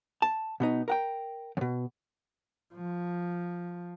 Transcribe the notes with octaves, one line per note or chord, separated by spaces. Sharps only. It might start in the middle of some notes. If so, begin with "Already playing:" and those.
A5
B2 B3 D#4
A#4 F#5 G5
E2 B2
F3